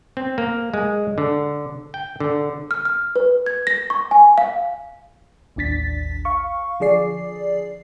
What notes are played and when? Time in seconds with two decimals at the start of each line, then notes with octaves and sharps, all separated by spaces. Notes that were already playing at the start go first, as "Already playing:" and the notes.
0.17 C4
0.38 A#3
0.74 G#3
1.18 D3
1.94 G5
2.20 D3
2.71 F6
2.85 F6
3.16 B4
3.46 G#6
3.67 A#6
3.90 C#6
4.11 G#5
4.38 F5
5.56 A1 D#2 D4 A6 B6
6.25 F5 C#6
6.80 D3 F3 G#4 D5 C7